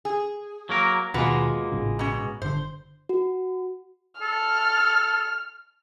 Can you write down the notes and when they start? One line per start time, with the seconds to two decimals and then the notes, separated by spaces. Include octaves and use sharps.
0.05 G#4
0.69 F#3 A#3 A#4
1.14 D#2 B2 G#3 A#3 F4 F#4 B4
1.72 A1 G#2 C#3
1.99 B2 C#4
2.42 G1 D3 C5
3.09 F#4
4.21 A4 F6